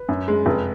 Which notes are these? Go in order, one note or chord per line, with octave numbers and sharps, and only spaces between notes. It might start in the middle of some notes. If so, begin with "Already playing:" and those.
Already playing: B4
F#2
G#3
F1